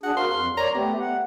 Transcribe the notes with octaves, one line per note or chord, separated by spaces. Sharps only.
D4 G#4 F#5
F#4 A#4 F5 C6
F2
C#5 D5 A#5
A3 B3 G4
F#5